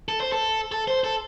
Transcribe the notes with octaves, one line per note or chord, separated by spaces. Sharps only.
A4
C5
A4
A4
C5
A4